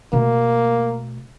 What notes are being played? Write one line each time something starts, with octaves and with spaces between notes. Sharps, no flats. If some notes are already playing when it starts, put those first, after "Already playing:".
B2 A3 A#3